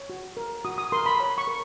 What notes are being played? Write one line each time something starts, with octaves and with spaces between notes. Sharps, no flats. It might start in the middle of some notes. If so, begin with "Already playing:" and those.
Already playing: C#5
F#4
A#4
F#4 D#6
D#6
A#4 C6
B5
C#5 B5
C#6
A#4